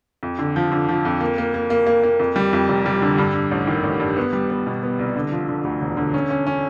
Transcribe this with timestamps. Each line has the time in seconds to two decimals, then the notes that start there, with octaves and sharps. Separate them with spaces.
0.23 F2
0.39 D3
0.56 F3
0.72 D3
0.89 F3
1.05 F2
1.21 A#3
1.38 A#3
1.54 A#3
1.70 A#3
1.87 A#3
2.03 A#3
2.20 F2
2.36 G3
2.53 F2
2.69 F1
2.86 G3
3.02 D3
3.18 G2
3.34 G2
3.51 A1
3.67 D#3
3.83 A1
4.00 G2
4.17 B3
4.33 G3
4.50 B3
4.67 B2
4.83 B3
4.99 C2
5.16 D3
5.32 F3
5.48 D3
5.65 D2
5.81 E1
5.97 D3
6.14 C#4
6.30 C#4
6.47 C#4